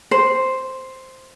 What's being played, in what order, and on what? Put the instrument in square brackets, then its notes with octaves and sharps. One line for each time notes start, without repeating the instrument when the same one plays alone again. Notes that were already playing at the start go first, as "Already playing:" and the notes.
[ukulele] C5